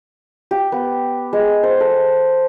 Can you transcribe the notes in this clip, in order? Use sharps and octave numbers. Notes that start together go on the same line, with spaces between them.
G4
B3
G#3
C5
A4